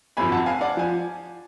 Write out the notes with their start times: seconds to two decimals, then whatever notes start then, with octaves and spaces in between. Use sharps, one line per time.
0.17 G#1 F#2 F3 G#5 B5
0.32 F#5 A5
0.46 F5 G#5
0.61 D5 F#5
0.77 F3 G#5